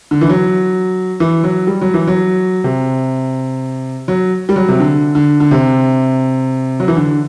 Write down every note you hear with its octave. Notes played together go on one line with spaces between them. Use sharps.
D3
E3
F#3
E3
F#3
G3
F#3
E3
F#3
C3
F#3
G3
F#3
C3
D3
D3
D3
C3
F#3
E3
D3